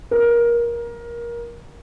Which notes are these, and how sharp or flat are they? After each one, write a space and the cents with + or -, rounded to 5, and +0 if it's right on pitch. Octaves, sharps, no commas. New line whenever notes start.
A#4 +20